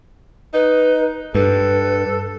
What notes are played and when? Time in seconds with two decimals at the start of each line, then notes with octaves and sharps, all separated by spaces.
0.54 D#4 B4
1.35 G2 A4 B4